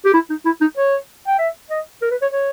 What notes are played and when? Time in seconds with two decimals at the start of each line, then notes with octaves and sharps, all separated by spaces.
0.05 G4
0.14 E4
0.30 D#4
0.46 E4
0.61 D#4
0.77 C#5
1.27 G5
1.39 E5
1.70 D#5
2.02 A#4
2.11 B4
2.22 C#5
2.33 C#5